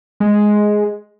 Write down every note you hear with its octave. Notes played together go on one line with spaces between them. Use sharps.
G#3